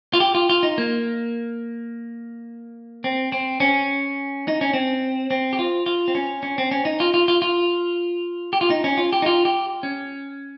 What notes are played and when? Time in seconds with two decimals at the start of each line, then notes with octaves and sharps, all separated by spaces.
0.13 F4
0.20 G4
0.35 F4
0.50 F4
0.63 D#4
0.78 A#3
3.04 C4
3.32 C4
3.60 C#4
4.48 D#4
4.61 C#4
4.74 C4
5.31 C4
5.53 G4
5.59 F4
5.86 F4
6.08 C4
6.15 C#4
6.43 C#4
6.58 C4
6.71 C#4
6.85 D#4
7.00 F4
7.14 F4
7.28 F4
7.42 F4
8.53 G4
8.61 F4
8.70 D#4
8.84 C#4
8.98 F4
9.13 G4
9.22 D#4
9.26 F4
9.45 G4
9.83 C#4